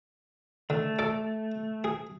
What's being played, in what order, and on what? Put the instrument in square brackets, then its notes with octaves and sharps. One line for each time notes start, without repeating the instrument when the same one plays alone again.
[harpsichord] D3 [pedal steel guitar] A3
[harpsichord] A4 D5
G#4